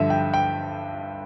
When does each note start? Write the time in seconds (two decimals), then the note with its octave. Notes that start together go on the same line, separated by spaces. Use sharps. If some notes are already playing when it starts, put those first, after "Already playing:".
Already playing: G2 D3 F3 E5
0.10 G5
0.34 G5